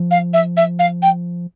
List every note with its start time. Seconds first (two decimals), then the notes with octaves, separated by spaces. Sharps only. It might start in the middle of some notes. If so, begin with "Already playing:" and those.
Already playing: F3
0.11 F5
0.33 E5
0.57 E5
0.79 F5
1.02 G5